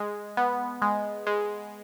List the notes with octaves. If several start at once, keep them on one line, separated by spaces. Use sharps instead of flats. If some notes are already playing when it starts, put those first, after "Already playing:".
Already playing: G#3
B3
G#3
G#3